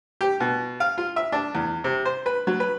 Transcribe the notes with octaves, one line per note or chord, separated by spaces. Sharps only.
G4
B2
F5
F4
E5
D4
E2
C3
C5
B4
F#3
B4